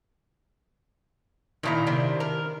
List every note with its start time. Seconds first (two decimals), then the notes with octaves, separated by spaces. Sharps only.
1.63 A#2 D#3 E4 A4 A#5
1.87 C3 D4
2.20 A#4